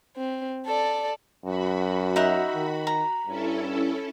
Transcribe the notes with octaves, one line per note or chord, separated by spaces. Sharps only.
C4
A4 D5
F#2 F#4 B5
D#4 E5 F#5
D#3
A#5
G2 C#4 E4 A4